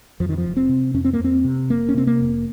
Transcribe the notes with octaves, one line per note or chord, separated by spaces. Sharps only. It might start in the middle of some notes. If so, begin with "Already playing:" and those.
F2 F3
D#3
F3
F1
C4
C3
F2 C#4
C4
A#3
F2 C4
C3
F1 A#3
C#4
C3 C4
A#3
F1